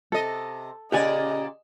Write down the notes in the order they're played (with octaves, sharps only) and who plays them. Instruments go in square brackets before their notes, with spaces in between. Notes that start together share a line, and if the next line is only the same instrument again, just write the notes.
[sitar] C3 D#5 [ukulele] A4
[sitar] A#2 C#3 D5 [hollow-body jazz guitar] G4 F#5 G#5 [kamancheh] D#5